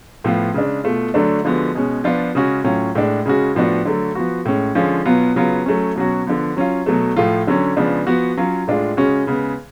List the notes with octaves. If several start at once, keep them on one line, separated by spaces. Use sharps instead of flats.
A2 F3 B3 F4
C#3 G#3 D4
B2 A3 F4
D3 F#3 A3 D4
D3 F3 G#3 B3 F#4
B2 G#3 C#4
F3 B3 D4 F4
C#3 G#3 C#4 F#4
A2 F#3 C#4 F4
A2 G#3 D4
C#3 G#3 C#4 F#4
A2 F3 B3 D4 F#4
D3 F#3 A3
F3 B3 F#4
A2 G#3 C#4
D3 F3 G#3 C#4 F4
B2 F#3 B3 F4
C#3 F#3 B3 F4
F#3 A3 C#4
B2 F#3 C#4 F#4
D3 F3 B3
F#3 C#4 F4
B2 F#3 A3
A2 F3 A3 F4
D3 F#3 C#4
C#3 F3 G#3 B3 D4
F3 B3 F#4
F#3 C#4 F4
A2 G#3 D4 F4
C#3 G#3 C#4 F#4
C#3 G#3 B3